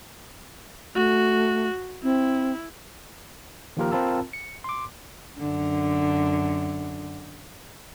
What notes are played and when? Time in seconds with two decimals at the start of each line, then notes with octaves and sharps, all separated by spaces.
0.95 A3 F#4
2.03 C4 E4
3.77 D#3 F3 A#3 F4 G4 A#4
3.92 C4 F4 A#4 A5 B5 E6
4.33 C#7
4.64 C6 D6
5.39 F#2 D3